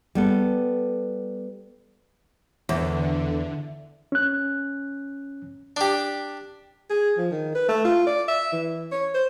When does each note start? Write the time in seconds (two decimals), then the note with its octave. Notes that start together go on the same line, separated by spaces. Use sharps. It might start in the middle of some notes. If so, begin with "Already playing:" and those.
0.15 G3 B3 A4
2.69 E2 D3
4.12 C#4 F#6
5.77 D4 G4
6.90 G#4
7.17 F3
7.31 D#3
7.55 B4
7.69 A3
7.85 F4
8.06 D5
8.28 E5
8.52 E3
8.91 C#5
9.14 C5